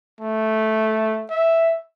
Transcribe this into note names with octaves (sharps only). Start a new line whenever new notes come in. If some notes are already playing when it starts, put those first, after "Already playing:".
A3
E5